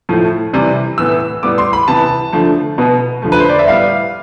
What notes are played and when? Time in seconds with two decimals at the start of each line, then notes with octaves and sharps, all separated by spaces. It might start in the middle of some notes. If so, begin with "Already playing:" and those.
0.09 A2 F3 A3
0.53 C3 E3 G3
0.98 A2 E3 B3 E6
1.43 A2 G3 B3 D6
1.58 C6
1.73 B5
1.88 C3 E3 B3 A5
2.33 D3 F3 A3
2.78 B2 B3
3.22 D3 F3 A3
3.32 B4
3.40 C5
3.49 D5
3.59 E5
3.67 A2 G3 B3 F5